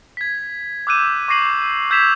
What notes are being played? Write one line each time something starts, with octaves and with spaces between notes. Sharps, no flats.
G#6 B6
D6 E6 F#6 G6 D#7 E7
C#6 D6 A#6 C7 D#7 F#7
E6 G6 G#6 B6 E7 F7